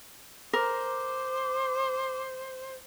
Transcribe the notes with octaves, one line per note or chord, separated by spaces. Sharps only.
A#4 C5 D6